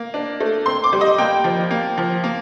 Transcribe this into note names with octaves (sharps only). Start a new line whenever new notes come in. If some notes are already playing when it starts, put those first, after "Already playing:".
Already playing: A#3
D4
A3
C4 C6
D6
G3
D#5
A#3 G5
F3
A#3
F3
A#3